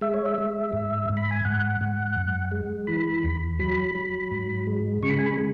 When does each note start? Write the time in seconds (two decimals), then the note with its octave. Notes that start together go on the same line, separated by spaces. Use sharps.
0.01 G#3 E5
0.14 C#5
0.26 E5
0.38 G#3
0.73 G#2
1.09 G#2
1.17 B5
1.31 G#5
1.45 G#2 F#5
1.81 G#2
2.16 F#2
2.51 G#3
2.87 E3 B5
3.23 E2
3.59 F#3 B5
3.95 F#3
4.31 G#2
4.67 G#3
5.03 C#3 C#6
5.10 B5
5.19 G#5
5.26 B5
5.37 G#3